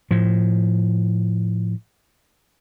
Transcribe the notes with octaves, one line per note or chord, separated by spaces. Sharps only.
A2 F3